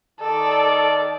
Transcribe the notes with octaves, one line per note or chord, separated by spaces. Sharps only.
D#3 A4 D5